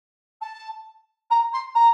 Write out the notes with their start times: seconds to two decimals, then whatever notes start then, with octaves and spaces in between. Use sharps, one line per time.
0.41 A5
1.30 A#5
1.53 C6
1.75 A#5